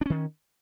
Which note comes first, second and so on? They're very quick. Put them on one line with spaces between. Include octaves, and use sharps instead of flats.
D4 C#4 D#3